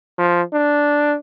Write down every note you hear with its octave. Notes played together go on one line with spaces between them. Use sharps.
F3
D4